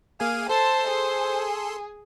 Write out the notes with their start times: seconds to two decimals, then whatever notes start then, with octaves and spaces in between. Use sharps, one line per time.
0.20 A#3 G#4 F5 G#5
0.49 A4 C5 A5 C6
0.88 G#4